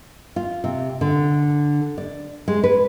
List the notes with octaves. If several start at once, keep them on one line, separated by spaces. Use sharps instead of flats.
F4
C3
D3
D5
G#3
B4